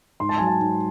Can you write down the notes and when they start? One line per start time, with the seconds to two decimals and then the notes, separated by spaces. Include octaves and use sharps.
0.20 G#2 C6
0.29 A5
0.38 F#3 G#5
0.47 A5
0.60 G#2